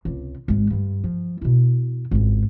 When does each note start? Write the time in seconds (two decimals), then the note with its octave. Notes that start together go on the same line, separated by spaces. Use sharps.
0.05 C#2 C3
0.48 G#1 G#3
0.70 G2 D3
1.04 F3
1.41 B2 E4
2.11 G#1 C#2